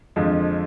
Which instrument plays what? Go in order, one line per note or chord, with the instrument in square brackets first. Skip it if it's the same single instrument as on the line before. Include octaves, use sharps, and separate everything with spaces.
[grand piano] F2 D3 F3 G#3